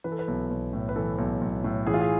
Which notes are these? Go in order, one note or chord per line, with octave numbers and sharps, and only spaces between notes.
E3 B4
A4
B4
B1
B1
A2
B4
E3 A4
B1
B1
A2
E3 G#4
F4
G#4